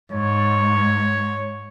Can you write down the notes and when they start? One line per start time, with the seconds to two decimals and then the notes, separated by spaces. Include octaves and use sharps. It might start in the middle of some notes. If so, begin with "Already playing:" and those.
0.12 G#2 C#5